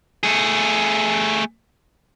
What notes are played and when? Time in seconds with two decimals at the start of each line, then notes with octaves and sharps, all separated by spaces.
0.23 A3 G#4